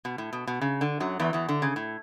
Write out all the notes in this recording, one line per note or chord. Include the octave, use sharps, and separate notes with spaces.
B2
A2
B2
B2
C#3
D3
F#2 F#3
E2 E3
E2 E3
D3
C#3
A2